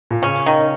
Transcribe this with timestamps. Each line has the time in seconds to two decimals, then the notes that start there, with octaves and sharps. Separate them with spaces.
0.11 A#2
0.22 C#3 C#4
0.46 D#3